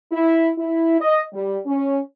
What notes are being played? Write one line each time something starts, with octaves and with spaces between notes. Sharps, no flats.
E4
E4
D#5
G3
C#4